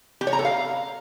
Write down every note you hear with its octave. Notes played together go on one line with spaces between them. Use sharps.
G4
C#5
A#5
A4
F5